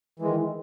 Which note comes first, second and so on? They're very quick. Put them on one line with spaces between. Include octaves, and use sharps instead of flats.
E3 G#3 D#3